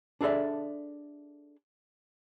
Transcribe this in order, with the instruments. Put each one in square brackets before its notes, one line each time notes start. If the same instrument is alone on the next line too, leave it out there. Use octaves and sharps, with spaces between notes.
[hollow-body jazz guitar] D4 G#4 A4 D5 E5